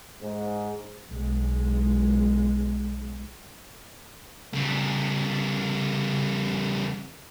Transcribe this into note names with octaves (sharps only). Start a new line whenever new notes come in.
G#2
B1 G#3
C#3 G3